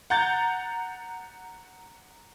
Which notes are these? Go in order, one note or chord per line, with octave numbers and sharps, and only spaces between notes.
F#5 A#5 G6 A6